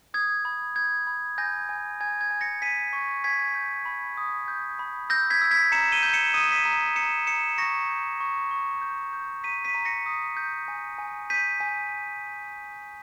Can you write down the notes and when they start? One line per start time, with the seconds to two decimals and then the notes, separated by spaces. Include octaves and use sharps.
0.14 D#6 G#6
0.45 B5
0.76 G6 G#6
1.07 B5
1.38 G#5 G6 A#6
1.69 G#5
2.00 G#5 G#6
2.21 G#6
2.31 G#5
2.41 A#6 C#7
2.62 G#5 B6 D#7
2.93 C#6
3.24 G#5 G#6 B6
3.55 G6
3.85 B5
4.17 D#6
4.48 G6
4.79 B5
5.10 E6 G6 A#6
5.30 G#6 B6
5.41 E6
5.51 G#6 B6
5.72 A#5 C#7 E7
5.92 D#7 G7
6.03 G6
6.14 C#7 E7
6.34 D#6 D#7
6.44 E7
6.52 B6 D#7
6.65 A#5
6.96 A#5 C#7 E7
7.27 A#5 C#7 E7
7.58 C#6 A#6 C#7
7.89 G6
8.20 C#6
8.51 C#6
8.81 G6
9.13 G6
9.44 A#5 B6 D#7
9.65 B6 D#7
9.75 A#5
9.85 A#6 C#7
10.06 D#6
10.37 G6
10.68 G#5
10.98 G#5
11.30 G6 B6 D#7
11.60 G#5